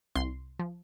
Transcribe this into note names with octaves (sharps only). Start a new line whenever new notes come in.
C2 C6
F3